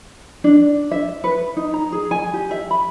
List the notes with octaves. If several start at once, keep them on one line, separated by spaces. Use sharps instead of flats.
D4
E5
B4
D#4
A#5
G#4
G#5
G4
E5
B5